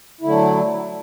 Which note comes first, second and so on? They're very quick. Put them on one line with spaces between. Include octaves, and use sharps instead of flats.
E4 D3 A3 F#3